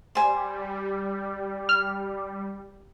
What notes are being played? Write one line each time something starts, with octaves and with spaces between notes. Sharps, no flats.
G3 C5 G#5
F6